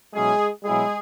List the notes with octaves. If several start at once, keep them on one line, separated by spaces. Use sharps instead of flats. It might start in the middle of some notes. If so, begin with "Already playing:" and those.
B2 F#3 G#3 C#4 E4 G#4
B2 F#3 G#3 E4 G#4